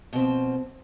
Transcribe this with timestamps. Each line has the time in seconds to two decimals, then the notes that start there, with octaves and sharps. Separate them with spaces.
0.13 B2
0.15 C4
0.18 F3